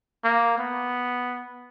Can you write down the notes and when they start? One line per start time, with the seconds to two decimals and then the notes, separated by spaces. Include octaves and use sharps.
0.24 A#3
0.58 B3